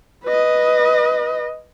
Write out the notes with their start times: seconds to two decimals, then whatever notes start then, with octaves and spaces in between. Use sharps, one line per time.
0.24 B4 D#5